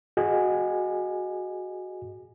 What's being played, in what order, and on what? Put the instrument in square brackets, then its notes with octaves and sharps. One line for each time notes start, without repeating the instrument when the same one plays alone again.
[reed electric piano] F#4 G#4 D#5 G#5